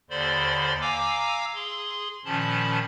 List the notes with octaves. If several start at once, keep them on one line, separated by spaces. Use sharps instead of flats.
D#2 D3 C5 D5 B5 C6
F5 G#5 A#5 D6 E6
G#4 C6
A#2 D#3 F3 C#4 A5 B5